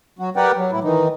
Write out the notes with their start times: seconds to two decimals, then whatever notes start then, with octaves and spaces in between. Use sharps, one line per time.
0.19 F#3 F#4
0.36 G4 A#4 B4 D5 F#5 G5
0.57 F#3
0.72 A2 E4
0.84 D#3 E3 D#4